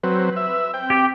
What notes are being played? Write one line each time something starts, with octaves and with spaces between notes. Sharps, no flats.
F#3 C4 B4
E5
C4 G5
G4